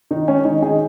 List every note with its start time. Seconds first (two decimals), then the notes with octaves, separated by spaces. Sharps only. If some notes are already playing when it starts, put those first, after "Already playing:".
0.11 D#3 D#4
0.28 G#3 C#4
0.45 D#3 D#4
0.62 D#3 D#4 G#4